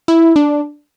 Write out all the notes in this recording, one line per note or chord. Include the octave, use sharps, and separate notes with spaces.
E4
D4